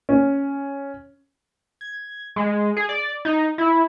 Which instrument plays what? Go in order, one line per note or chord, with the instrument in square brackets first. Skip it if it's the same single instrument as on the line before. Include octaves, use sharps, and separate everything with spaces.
[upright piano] C#4
[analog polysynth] G#6
G#3
G#4
D5
D#4
E4